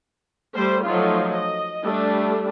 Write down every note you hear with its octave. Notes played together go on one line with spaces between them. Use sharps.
G3 A3 C5
F3 F#3 A3 D#4 F4
D#5
G3 A3 D4